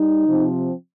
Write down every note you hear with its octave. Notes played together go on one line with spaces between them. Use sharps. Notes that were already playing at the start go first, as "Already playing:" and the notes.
Already playing: G3 D#4
C3 F3 C4